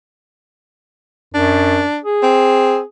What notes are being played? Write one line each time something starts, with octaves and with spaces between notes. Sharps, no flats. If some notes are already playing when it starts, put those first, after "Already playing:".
F#2 D4
G#4
C4